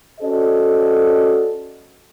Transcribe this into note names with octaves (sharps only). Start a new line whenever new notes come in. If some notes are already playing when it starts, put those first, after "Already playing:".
C#4 F#4 A4 C5 D5 D#5